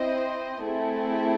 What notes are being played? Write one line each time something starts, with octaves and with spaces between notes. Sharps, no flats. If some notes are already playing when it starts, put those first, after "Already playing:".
Already playing: C4 E4 C5 D#5
A3 C4 E4 G#4